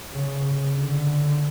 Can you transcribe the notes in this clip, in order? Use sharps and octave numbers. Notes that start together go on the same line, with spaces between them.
C#3
D3